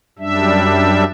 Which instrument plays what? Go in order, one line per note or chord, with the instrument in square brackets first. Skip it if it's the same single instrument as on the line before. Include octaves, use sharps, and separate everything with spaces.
[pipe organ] F#2 G3 D4 E5